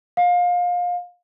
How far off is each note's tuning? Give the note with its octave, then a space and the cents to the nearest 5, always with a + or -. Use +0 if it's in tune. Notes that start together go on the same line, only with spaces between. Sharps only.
F5 +25